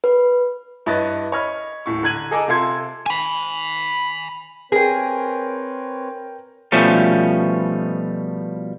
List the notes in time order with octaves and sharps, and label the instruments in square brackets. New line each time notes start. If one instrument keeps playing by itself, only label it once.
[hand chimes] B4
[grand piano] G2 E4 B4 C#5 D#5 A6
C#5 D#5 B5 F6
D#1 A2 C#6
D3 A#5 F#6 G#6 D#7 F#7
G#4 A4 D#5 G#5 A#5 D6
C3 F4 A4 C6 G#6
[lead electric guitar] G#5 B5
[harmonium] C4 B4 C#5 [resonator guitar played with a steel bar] G#4 [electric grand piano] A#4 G5
[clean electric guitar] B2 F3 G3 A3 C#4